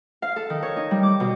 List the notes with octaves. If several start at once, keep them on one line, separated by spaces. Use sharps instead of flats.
F5
A4
D#3
C#5
D#4
G3
D6
B2